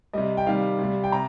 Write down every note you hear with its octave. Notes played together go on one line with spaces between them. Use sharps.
C3 G3 D#5
G5
C3 D#3 G3 F5
C3 G3
G5
C3 A#5